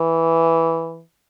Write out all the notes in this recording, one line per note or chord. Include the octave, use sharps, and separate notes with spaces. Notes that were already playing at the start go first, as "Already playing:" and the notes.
Already playing: E3